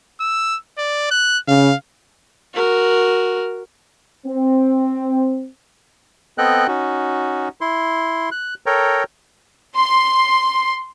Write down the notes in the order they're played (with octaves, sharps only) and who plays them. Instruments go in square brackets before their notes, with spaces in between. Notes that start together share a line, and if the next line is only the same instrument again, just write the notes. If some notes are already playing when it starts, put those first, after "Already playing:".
[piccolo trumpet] E6
D5
F#6
[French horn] C#3 [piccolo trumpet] F5
[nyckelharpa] F#4 A#4
[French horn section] C4
[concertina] B3 C4 A4 D#5 G5 F#6
C#4 D#4 F#4
E4 C6
F#6
A4 A#4 C#5 G5 A#5
[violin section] C6